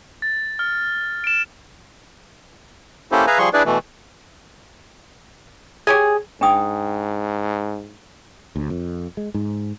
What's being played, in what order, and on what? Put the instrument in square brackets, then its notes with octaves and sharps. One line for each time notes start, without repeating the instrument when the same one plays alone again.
[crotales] A6
F6
D7 E7
[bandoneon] A#3 C#4 E4 G4 A4 C5
G#4 B4 E5 F5 G#5 A#5
F3 G3 G#4 C6 C#6
D4 E4 G#4 B4 D5
B2 E3 A3
[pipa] G4 C#5 G#5 [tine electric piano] G#4
[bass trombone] G#2 [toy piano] D4 G5 D#6
[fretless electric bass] D2
F2
G#3
G#2